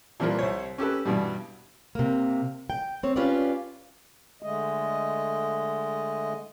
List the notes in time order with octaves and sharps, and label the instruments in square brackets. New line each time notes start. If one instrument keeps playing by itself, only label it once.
[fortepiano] A#2 E3 F3 G3 F4 A#4
C2 C5 C#5
C#4 G4 A4 B4
G2 B2 E3 G3
[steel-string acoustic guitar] C3 A#3
G5
C4 C#5
C#4 F4 G4 B4 D5
[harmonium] D3 G#3 A3 D#5